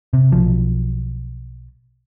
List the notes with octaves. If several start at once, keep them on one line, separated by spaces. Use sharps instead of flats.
C3
B1 F3